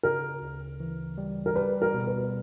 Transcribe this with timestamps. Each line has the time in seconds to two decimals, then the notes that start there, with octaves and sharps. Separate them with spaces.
0.03 C#3 A#4
0.42 D2
0.80 E3
1.18 G3
1.46 A#4
1.56 G3 B4
1.82 A#4
1.94 B2
2.07 B4